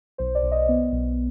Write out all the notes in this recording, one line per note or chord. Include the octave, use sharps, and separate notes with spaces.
B1 C5
D5
B1
D#5
B3
B1